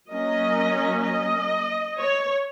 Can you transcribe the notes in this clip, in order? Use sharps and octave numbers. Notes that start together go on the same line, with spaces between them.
F#3 A#3 C#4 D#5
D#5
C#5